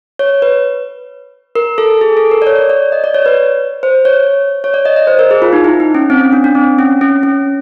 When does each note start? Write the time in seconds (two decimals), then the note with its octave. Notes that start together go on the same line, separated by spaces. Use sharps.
0.19 C#5
0.42 B4
1.55 A#4
1.78 A4
2.01 G#4
2.17 A4
2.31 A#4
2.42 D5
2.47 C#5
2.70 D5
2.92 D#5
3.04 D5
3.14 C#5
3.26 B4
3.83 C5
4.05 C#5
4.64 C#5
4.74 D5
4.85 D#5
4.96 D#5
5.07 C5
5.19 A#4
5.31 G#4
5.42 F4
5.53 D#4
5.64 E4
5.80 D#4
5.95 C#4
6.10 C4
6.21 C#4
6.33 D4
6.44 D4
6.55 C4
6.79 C#4
7.01 C#4
7.23 C#4